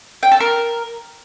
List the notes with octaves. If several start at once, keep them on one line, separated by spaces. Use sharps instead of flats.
G5
A4
A#4